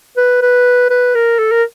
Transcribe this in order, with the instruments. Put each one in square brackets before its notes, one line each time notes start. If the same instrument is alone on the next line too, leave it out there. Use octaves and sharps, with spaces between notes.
[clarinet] B4
B4
B4
A#4
A4
A#4